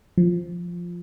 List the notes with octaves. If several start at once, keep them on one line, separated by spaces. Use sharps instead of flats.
F3